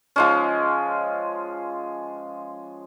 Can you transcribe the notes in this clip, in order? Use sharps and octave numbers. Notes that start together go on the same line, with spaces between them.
F3 G#3 C#4